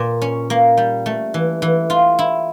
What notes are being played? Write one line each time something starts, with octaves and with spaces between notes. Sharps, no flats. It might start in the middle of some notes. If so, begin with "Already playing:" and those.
Already playing: A#2
C#4
A#3
G3
A3
E3
E3
F4
E4